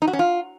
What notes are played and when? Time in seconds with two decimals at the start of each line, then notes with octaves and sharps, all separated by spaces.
0.02 D#4
0.08 F#4
0.13 C#4
0.19 F4